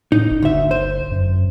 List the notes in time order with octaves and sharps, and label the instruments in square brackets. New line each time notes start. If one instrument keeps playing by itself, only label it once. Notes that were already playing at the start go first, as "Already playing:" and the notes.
[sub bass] A2 [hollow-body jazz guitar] D#4
[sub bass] G1
[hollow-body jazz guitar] D2 E5
C5
[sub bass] F#2